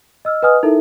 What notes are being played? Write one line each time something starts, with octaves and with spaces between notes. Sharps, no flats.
D#5 E6 F6
B4 D#5 F#5 G#5 D#6 F6
D#4 E4 A4 A#4 E5